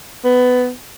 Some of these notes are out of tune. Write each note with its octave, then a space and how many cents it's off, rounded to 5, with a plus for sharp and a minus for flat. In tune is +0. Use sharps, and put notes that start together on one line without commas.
B3 +15